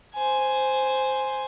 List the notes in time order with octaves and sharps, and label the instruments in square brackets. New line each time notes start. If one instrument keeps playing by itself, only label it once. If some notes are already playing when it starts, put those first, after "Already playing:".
[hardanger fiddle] C5 G#5